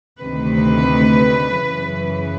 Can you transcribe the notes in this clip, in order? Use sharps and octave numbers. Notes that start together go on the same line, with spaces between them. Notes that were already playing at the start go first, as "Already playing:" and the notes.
D2 C3 D#3 B4
F#2 C#3 E3